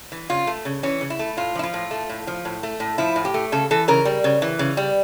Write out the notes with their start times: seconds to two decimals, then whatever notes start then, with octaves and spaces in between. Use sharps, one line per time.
0.12 E3
0.30 C#3 F4
0.47 A3
0.65 C#3
0.83 E3 C#4
1.01 C#3
1.10 E4
1.19 A3
1.37 A2 F4
1.55 F3 E4
1.63 F4
1.74 A2
1.91 A3
2.09 A2
2.27 F3
2.45 A2
2.63 A3
2.80 A2
2.98 F3 E4
3.16 A2
3.25 G4
3.34 A3
3.52 C#3 A4
3.71 E3 A4
3.88 C#3 A#4
4.05 G3
4.24 C#3
4.42 E3
4.59 C#3
4.77 G3